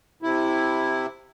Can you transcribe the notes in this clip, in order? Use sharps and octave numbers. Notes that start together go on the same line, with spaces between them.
C3 E4